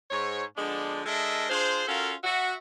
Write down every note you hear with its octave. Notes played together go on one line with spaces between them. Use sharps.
G#2 C#5
D3 F3 G#3 B3 D4
G#3 D4 A4 A#4 D#5 E5
D4 F4 G#4 C5
C#4 F4 F#4 A4 A#4 F5
F#4 E5